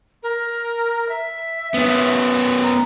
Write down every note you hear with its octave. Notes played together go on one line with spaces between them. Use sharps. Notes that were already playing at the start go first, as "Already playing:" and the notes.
A#4
E5
B3 C#4
A#5